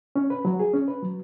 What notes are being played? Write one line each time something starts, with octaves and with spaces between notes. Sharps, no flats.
C#4
B4
F#3
G#4
C#4
B4
F#3